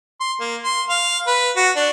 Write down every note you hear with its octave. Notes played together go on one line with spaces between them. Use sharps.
C6
A#3
C6
F5
B4
F#4
D4